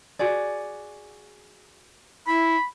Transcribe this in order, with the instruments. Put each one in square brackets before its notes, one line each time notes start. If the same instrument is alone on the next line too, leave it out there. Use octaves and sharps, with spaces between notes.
[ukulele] F#4 G#4 D5
[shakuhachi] E4 [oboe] B5